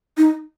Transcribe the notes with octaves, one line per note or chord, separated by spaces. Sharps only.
D#4